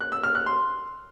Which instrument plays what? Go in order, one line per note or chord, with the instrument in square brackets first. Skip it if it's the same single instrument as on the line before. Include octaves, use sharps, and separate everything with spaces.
[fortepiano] F#6
E6
F6
F#6
C6